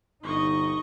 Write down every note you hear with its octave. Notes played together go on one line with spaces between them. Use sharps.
G1 D#4 D#5 C#6